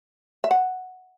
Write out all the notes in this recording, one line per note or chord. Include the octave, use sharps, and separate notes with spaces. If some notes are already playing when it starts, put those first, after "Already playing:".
E5
F#5